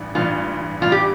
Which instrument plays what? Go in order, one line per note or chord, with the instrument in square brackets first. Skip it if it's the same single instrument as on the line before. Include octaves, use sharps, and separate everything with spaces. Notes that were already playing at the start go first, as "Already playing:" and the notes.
Already playing: [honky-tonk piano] A1 G2 E3
[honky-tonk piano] A1 G2 E3 [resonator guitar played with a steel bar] F4
[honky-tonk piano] A1 G2 E3 [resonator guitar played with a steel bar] F4
[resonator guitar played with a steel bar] G4